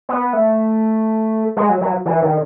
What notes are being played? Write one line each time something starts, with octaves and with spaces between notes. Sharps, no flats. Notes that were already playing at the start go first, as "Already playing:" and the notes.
B3
A3
G#3
F#3
F#3
E3
D#3